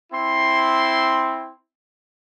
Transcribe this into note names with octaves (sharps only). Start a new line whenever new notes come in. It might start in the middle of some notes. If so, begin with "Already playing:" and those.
C4 E4 C6